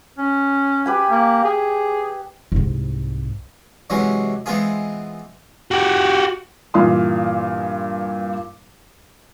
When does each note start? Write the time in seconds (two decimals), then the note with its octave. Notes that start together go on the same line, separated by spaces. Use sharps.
0.18 C#4
0.86 G4 B4 G#5
1.10 A#3
1.44 G#4
2.52 C2 G#2
3.90 C3 E3 F#3 G#3 C#4
4.46 E3 G#3 B3 C4 F4 G#4
5.71 F#4 G4
6.74 G2 A#2 E3 F5 C6 D#6